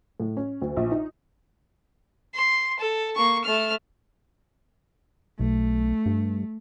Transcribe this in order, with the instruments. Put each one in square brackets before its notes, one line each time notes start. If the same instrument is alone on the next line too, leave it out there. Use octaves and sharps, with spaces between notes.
[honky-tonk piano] A2
C#4
D2
A#1
D#4
[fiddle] C6
A4
A#3 C#6
A3 F6
[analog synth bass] B1 [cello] A3
[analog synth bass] G2